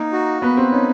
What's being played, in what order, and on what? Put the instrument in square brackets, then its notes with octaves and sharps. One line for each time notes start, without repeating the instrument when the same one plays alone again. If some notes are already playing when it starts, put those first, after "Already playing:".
Already playing: [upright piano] A#3 [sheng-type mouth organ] D#4
[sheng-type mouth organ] F#4
[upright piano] B3 [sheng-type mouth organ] B4
[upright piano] C4
[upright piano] C#4 [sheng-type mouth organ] D#4